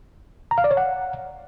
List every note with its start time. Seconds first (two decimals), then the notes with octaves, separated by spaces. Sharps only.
0.51 A#5
0.58 F5
0.64 D5
0.71 C#5
0.77 F#5